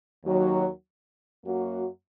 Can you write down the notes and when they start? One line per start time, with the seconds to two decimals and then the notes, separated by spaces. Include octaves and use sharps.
0.23 D#2 D#3 F#3
1.44 F#2 F#3 A#3 F#4